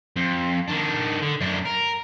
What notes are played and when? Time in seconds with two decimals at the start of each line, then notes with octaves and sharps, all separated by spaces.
0.17 F2
0.69 D#3 D4
1.22 D3
1.41 F#2 D4
1.65 A#4